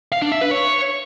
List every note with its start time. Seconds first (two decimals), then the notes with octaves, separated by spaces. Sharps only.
0.12 F5
0.22 D4
0.32 E5
0.41 B4
0.51 C#5